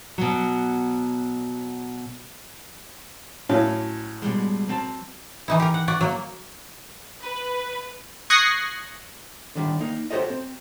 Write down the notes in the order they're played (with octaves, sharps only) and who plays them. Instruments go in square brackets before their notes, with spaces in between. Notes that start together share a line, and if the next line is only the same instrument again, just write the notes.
[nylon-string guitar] B2 F#3
[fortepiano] A2 F#3 C#4 [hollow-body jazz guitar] F5
[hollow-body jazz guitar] B2 G3 G#3
F#3 C4 A5
[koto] E3 D#4 E4
G4 A#4
F#5
F#4 D5
F#3 A#3
[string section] B4
[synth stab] C#6 D#6 F#6 G#6 A#6 C7
[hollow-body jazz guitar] D3 D#3 G3
A#3 D#4
F#4 G4 A4 C5 C#5 D#5
C4